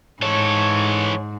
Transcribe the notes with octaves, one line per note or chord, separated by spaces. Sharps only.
G#2 E3 A4 C#5